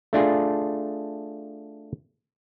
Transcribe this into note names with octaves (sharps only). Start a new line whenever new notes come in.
A3 D4 F4 G#4